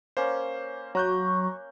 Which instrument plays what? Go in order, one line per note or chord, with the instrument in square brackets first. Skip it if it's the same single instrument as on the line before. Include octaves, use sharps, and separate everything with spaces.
[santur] A#3 C#4 [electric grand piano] C5
[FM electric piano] F#3 [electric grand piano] A#5 F#6 G6 [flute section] C#6